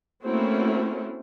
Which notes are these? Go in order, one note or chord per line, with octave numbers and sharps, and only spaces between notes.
A3 A#3 C4 C#4 E4 F#4